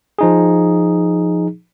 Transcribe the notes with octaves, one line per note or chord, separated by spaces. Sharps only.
F3 D#4 G#4